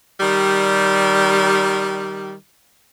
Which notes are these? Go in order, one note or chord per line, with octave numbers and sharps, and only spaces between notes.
D#3 G3